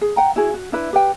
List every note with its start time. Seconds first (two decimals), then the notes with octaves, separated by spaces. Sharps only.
0.01 G#4
0.16 F#5 G5 A#5
0.36 E4 F#4 G#4
0.54 F#4
0.72 D4 E4 B4 E5
0.93 G4 B4 G5